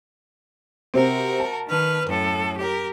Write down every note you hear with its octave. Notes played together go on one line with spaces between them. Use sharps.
C3 C4 F#4 A#4
A5
D#3 B4 F6
F#2 A2 A4
G4 A#4